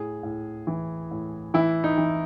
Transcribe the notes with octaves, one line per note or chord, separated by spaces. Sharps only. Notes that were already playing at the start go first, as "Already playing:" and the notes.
Already playing: A2 G#4
A2
E3
A2
E3 E4
D#4
E3